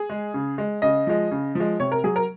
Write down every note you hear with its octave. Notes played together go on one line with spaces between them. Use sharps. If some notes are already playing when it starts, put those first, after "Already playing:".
Already playing: G#4
G#3
C#3
G#3
C#3 D#5
F3 G#3
C#3
F3 G#3
C3 C#5
A#4
F#3 G#4
A#4